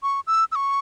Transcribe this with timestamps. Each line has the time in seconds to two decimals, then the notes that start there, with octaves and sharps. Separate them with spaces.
0.03 C#6
0.27 E6
0.52 E6
0.56 C#6